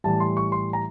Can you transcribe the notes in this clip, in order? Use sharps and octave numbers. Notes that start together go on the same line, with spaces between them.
A2 E3 G3 A5
C6
C#6
C6
A#5